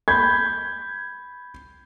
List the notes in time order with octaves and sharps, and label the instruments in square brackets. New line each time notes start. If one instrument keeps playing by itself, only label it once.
[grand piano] B5 G6 G#6